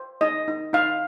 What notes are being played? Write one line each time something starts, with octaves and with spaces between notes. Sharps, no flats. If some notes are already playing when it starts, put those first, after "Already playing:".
Already playing: C5
D#4 D#5
D#4
D#4 F5